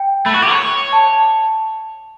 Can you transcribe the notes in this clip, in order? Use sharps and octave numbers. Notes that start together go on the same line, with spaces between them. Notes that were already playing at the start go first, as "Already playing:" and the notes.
Already playing: G5
A3 B5
F#4 C#6
G4 D6
C#5 C#6
A5